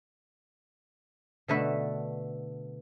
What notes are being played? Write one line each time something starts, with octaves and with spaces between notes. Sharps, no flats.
B2 D3 A3 B4 E5